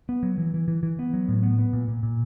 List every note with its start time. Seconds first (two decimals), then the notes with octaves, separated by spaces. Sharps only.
0.09 B3
0.23 F#3
0.38 E3
0.54 E3
0.68 E3
0.83 E3
0.99 B3
1.13 F#3
1.28 A2
1.43 B3
1.59 B3
1.73 A#2
1.88 A#2
2.03 A#2